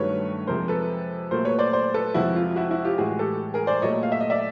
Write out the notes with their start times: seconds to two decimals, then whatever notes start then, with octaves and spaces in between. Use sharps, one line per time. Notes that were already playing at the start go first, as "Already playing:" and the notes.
Already playing: G2 D#3 F#3 A3 B4 C#5
0.47 F2 C3 F3 G#3 A#4 C5
0.68 A4 B4
1.31 A#2 F#3 A3 A#4 C5
1.45 B4 C#5
1.59 C5 D5
1.73 C5 D5
1.94 A4 B4
2.14 F2 C3 F3 G#3 E4 F#4
2.36 F4
2.56 E4 F#4
2.71 E4 F#4
2.84 F4 G4
2.98 A2 E3 G#3 F#4 G#4
3.19 G4 A4
3.54 G#4 A#4
3.67 C5 D5
3.82 A#2 F#3 A3 C#5 D#5
4.03 F5
4.12 E5
4.21 D#5
4.30 D5 E5